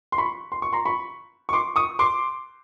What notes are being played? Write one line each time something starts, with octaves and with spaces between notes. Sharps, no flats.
C6
B5 C#6
C6
C#6
A#5 C6
B5 C#6
C#6
C6 D6
C#6 D#6
C6 D6